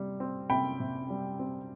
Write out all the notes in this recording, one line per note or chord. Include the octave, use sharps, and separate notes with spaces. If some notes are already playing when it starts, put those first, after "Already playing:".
Already playing: C3 G3
C4
C3 G5 B5
C3
G3
C4